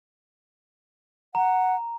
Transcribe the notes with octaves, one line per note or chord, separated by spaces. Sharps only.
F#5 A#5